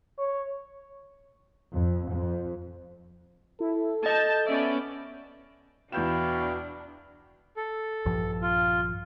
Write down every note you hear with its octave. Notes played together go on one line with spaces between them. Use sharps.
C#5
F2
F2
E4 A4
D#5 A5 G6
B3 C#4 D5 E5
E2 B2 D4 E4 F5 G5 G6 E7
A4
A#1 G2 F3
F4